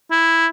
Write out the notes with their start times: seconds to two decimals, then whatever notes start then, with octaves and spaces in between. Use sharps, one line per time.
0.11 E4